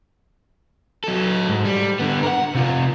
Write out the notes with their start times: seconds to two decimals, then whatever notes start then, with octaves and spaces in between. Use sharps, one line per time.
1.04 F#3 A4
1.49 G#2
1.65 G3
1.99 D3 B3
2.23 A#4 F#5
2.55 C3 F4